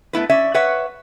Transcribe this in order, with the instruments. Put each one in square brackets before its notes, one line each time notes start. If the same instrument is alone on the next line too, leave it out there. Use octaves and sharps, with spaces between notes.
[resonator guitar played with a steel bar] A3 B3 E4 B4
C#4 D5 E5
B4 C#5 E5 F#5